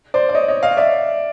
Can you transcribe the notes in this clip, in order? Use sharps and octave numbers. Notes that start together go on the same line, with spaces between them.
C5 D5
D5
C#5 D#5
C#5 D#5
D#5 F5
D5 E5